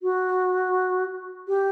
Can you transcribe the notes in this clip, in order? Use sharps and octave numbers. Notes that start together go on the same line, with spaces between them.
F#4
G4